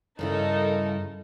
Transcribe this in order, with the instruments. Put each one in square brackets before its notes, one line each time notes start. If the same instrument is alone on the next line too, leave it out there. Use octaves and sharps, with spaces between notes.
[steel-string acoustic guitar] G2 C#3 E4 [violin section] D#4 A4 A#4